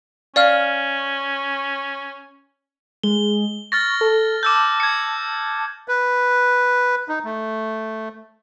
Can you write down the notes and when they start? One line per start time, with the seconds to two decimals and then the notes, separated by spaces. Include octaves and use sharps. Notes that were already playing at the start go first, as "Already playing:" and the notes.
0.36 C#4 D5 F5 F6
3.03 G#3 G7
3.72 C#6 F6 A6 A#6
4.01 A4
4.43 A5 D6 E6 G6
4.80 G#6 C#7
5.88 B4
7.09 D#4
7.25 A3